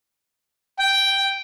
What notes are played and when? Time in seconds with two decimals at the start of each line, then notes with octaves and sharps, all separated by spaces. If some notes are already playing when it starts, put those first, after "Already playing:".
0.79 G5